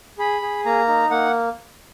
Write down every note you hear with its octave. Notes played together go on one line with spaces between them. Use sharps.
G#4 B5
G#4
A#3 A#5
D#4
A#3 F#5